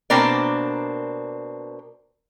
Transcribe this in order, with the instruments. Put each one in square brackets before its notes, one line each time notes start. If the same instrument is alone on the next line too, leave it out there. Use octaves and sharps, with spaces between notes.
[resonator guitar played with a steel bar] B2 A#3 C4 D4 A#4 D5